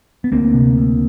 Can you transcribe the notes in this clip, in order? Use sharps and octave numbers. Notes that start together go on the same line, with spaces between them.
B3
D2 A#3 C4
C3
D2